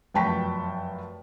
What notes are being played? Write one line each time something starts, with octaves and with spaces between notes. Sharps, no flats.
F1 F#2 G5 A5 C#6 B6